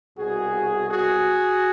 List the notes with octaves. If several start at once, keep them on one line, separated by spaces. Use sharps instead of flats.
C2 B2 F#4 G#4
F#4 G#4